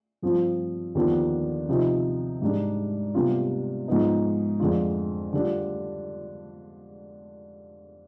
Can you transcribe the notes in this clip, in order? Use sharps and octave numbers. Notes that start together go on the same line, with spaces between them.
G2 F3 C4 F4
D#2 D3 F3 B3 D4
C3 F3 C4 D#4
G#2 G3 D4
C3 G3 B3 D4 F4
G#2 F3 B3 D#4
F2 D3 G#3 D4 F4
D3 G3 D4 F4